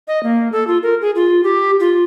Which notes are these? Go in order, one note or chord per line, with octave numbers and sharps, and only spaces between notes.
D#5
A#3
A4
F4
A#4
G#4
F4
G4
F4